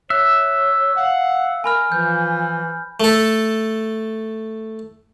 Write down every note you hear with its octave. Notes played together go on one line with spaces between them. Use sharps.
C#5 E5 F#6
F5 F#5
A#4 G#5 B5 F6
E3 F3 G6
A3 A4